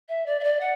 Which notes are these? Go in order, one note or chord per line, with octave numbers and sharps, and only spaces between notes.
E5
D5
E5
D5
F#5